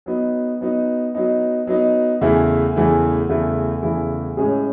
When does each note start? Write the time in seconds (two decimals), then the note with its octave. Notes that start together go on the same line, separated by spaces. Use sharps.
0.06 F#3 B3 D#4
0.61 F#3 B3 D#4
1.15 F#3 B3 D#4
1.67 F#3 B3 D#4
2.21 E2 C#3 E3 A3 E4
2.76 E2 C#3 E3 A3 E4
3.29 E2 C#3 E3 A3 E4
3.82 E2 C#3 E3 A3 E4
4.37 A2 G#3 C#4 G#4